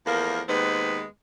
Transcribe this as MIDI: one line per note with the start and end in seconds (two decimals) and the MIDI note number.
0.07 0.43 40
0.07 0.43 53
0.07 0.43 57
0.07 0.43 58
0.07 0.43 70
0.49 1.04 39
0.49 1.04 56
0.49 1.04 59
0.49 1.04 60
0.49 1.04 71